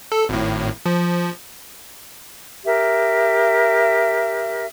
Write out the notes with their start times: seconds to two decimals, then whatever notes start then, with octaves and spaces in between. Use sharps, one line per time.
0.12 A4
0.29 G#1 A2
0.86 F3
2.65 G4 A#4 E5